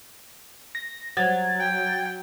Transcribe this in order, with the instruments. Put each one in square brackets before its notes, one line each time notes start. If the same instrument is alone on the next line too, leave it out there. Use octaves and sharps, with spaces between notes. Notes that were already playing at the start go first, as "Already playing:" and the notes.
[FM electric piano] A#6
[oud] F#3 [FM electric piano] G#6 A6
[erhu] G5